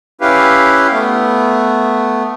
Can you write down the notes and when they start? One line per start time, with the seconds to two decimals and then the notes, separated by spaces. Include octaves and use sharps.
0.21 C#4 E4 G4 B4 F5
0.92 A3 B3